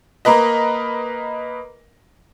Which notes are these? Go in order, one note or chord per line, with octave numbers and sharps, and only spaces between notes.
A#3 A#4 B4 D#5